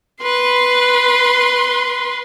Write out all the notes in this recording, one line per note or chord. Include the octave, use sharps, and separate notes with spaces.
B4 C6